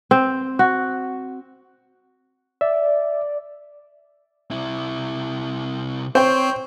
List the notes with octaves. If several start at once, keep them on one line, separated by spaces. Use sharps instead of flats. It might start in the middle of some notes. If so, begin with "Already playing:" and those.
C4
F#4
D5 E5
C3 E4
C4 C5 C#5 G5